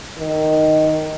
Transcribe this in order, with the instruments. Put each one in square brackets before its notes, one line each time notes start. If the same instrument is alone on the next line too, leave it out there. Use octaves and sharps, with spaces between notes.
[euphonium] D#3